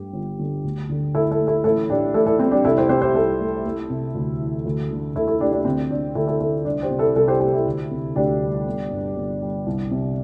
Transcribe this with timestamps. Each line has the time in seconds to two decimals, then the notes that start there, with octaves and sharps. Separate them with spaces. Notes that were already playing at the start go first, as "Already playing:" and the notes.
Already playing: G2 A3 G4
0.13 G1
0.39 D3
0.64 D2
0.89 D3
1.14 D2 E4 A4
1.31 E4 A4
1.39 A3
1.47 E4 A4
1.64 A1 E4 A4
1.89 A2 D4 G4
2.14 A1 E4 A4
2.26 E4 A4
2.39 G3 C4 E4
2.51 D4 G4
2.65 C2 E4 A4
2.78 G4 C5
2.89 C3 G4 C5
3.02 G4 C5
3.14 C2 E4 A4
3.40 A3
3.65 A3
3.90 C3
4.15 D2
4.40 E3
4.65 D2
4.91 D3
5.15 D2 E4 A4
5.28 E4 A4
5.40 A3 D4 G4
5.52 D4
5.65 D2 C4
5.90 D3 D4
6.15 D2 E4 A4
6.27 E4 A4
6.40 A3 E4 A4
6.65 C2 D4
6.82 G4 C5
6.90 C3
6.99 E4 A4
7.15 C2 E4 A4
7.28 G4 C5
7.40 A3 G4 C5
7.53 E4 A4
7.66 D2
7.91 C3
8.16 D2 D4 G4
8.42 G3
8.66 G1
8.91 G2
9.16 G1
9.42 G3
9.66 C2
9.91 C3